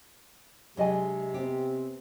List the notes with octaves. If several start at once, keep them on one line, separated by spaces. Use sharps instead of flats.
C3 F#3 G#3 D4 G#4 D#5 G#5
B3 C4 G4